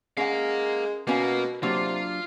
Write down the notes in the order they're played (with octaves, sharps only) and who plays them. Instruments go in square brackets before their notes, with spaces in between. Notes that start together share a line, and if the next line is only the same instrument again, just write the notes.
[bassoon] G#3 [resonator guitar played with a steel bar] C#4 F#5 [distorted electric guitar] A#4 F5
[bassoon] B2 [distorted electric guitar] A#3 [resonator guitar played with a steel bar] B3 C#4 F5
[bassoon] C3 [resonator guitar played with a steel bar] F#3 A#3 D4 [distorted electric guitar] F4